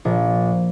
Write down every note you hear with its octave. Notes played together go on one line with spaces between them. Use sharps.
A#1